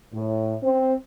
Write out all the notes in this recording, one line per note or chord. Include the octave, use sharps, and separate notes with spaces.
A2
C4